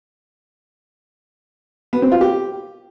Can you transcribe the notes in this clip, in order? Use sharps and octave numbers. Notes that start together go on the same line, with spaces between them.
B3
C4
F4
G4